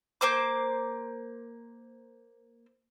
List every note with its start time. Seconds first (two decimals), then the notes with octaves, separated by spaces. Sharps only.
0.21 A#3 C5 D6